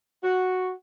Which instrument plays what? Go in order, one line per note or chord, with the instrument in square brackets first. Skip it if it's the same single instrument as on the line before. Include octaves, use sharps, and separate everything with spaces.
[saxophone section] F#4